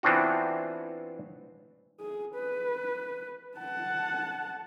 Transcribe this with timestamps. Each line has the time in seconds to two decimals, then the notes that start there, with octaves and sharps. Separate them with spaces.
0.03 E3 B3 C4 D4 F4 F#4
2.00 G#4
2.34 B4
3.57 F#5 A5